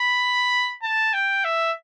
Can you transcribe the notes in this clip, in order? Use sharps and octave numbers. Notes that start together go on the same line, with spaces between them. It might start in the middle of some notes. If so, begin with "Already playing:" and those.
Already playing: B5
A5
G5
E5